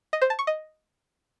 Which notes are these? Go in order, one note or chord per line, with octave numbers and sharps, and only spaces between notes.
D#5
C5
A5
C#6
D#5